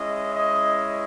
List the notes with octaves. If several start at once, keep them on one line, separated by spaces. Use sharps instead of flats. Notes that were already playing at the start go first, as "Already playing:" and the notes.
Already playing: G#3 C#4 E4 D#5
D#5